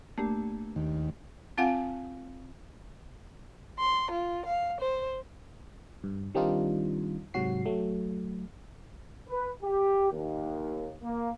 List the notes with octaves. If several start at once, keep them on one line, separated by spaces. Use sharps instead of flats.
A3 A#3 D4 G4
D#2
C4 F4 F5 F#5 G#5
C6
F4
F5
C5
G2
D#3 G3 C4 D4 D#4 F4
G#2 C3 F#3 F#4 C7
F#3 A3
B4
G4
D#2
A#3